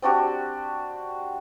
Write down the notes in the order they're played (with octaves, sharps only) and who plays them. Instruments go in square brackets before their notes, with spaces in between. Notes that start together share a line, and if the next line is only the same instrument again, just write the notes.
[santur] C4 D4 F#4 G4